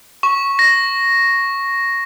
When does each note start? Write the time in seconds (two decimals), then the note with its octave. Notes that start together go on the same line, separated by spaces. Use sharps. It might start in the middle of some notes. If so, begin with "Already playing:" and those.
0.23 C#6
0.59 A#6